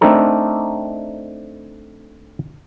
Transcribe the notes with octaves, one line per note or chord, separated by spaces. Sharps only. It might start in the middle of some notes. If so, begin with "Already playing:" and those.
A3 C4 D4 D#4 A4 A#4